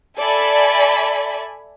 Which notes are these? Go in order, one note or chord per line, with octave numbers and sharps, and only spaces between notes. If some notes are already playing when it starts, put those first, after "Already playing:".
A4 D5 E5 G#5 B5